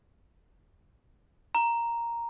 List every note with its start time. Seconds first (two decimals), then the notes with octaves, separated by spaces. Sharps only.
1.55 A#5